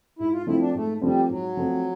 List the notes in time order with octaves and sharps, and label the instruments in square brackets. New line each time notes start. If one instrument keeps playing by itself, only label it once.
[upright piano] G#2 [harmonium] E4
[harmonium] F4
[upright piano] F3 A3 C4 F4 [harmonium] E4
[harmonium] D4
[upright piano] G#2 [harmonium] A3
[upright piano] F3 A3 C4 F4 [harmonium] G3
[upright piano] G#2 [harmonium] F#3
[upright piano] F3 A3 C4 F4